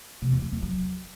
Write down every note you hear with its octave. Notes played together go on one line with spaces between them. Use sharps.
C3
E2
F#3
E2
F#3